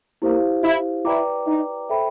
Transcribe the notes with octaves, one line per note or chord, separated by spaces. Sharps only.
A#3 E4 G4 C5 F5
E4
E4 B4 D5 G5 A#5 D6
D#4
A4 C5 E5 G5 B5